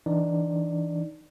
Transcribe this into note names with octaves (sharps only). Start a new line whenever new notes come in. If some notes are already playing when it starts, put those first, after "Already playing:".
E3 D4 D#4 D5